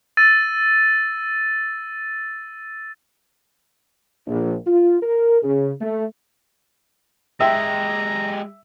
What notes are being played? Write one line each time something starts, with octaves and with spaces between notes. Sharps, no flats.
E6 A6 D#7
A#1
F4
A#4
C#3
A3
G#3 G4 E5 G5 A#5 C6